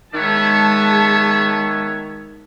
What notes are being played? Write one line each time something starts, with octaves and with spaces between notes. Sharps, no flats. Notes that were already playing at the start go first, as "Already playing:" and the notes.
D#3 G#3 B3 C#5 E5 A5